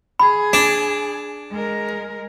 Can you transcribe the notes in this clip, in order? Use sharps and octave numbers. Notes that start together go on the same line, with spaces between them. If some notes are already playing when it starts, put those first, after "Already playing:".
G#4 B5
D4
G#3 A#4